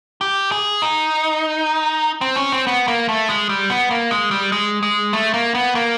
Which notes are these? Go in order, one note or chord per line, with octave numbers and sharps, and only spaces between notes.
G4
G#4
D#4
C4
C#4
C4
B3
A#3
A3
G#3
G3
B3
A#3
G#3
G3
G#3
G#3
A3
A#3
B3
A#3